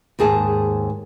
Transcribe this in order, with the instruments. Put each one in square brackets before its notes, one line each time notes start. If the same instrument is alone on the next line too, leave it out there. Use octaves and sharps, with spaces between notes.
[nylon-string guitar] D#2 G#2 G#4 A5